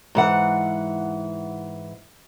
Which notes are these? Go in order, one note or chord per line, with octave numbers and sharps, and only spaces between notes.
G#2 E3 F#5